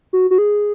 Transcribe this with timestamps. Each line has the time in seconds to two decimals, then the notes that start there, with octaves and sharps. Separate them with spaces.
0.13 F#4
0.31 F#4
0.38 G#4